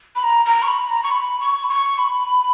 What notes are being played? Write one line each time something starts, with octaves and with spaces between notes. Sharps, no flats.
B5
A#5
A#5
C#6
B5
A#5
C#6
B5
C#6
B5
C#6
B5